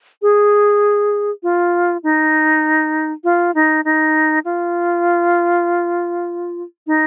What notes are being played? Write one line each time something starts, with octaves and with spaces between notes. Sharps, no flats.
G#4
F4
D#4
F4
D#4
D#4
F4
D#4